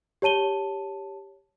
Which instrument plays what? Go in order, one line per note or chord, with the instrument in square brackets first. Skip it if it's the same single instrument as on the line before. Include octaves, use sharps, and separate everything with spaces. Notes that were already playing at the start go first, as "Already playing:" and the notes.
[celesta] G4 C#5 A5 D#7 G7